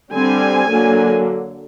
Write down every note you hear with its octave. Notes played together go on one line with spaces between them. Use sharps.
D3 G3 C4 G#5
D3 F#3 A#3